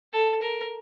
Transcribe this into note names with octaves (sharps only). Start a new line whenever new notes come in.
A4
A#4